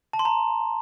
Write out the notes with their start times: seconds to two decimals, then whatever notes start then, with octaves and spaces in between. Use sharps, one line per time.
0.13 A5
0.19 C6
0.25 A#5